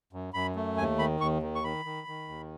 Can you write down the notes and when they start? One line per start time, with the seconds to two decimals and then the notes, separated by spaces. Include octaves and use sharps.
0.13 F#2
0.34 F#2 B5
0.55 A3
0.77 D#2 G#5
0.99 D#3 B5
1.20 D#2 C#6
1.42 D#3
1.55 C#6
1.64 D#3 B5
1.85 D#3
2.07 D#3
2.28 D#2